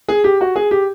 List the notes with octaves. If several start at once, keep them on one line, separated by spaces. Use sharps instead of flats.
G#4
G4
F#4
G#4
G4